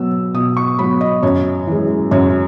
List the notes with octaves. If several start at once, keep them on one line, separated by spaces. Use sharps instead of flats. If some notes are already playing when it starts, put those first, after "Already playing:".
Already playing: B2 F#3 B3 E6
B2 D#6
C#6
F#3 B3 B5
D#5
F#2 C#5
E3 G#3
F#2 C#5